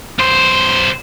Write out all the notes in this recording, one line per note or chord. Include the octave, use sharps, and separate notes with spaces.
B1 C5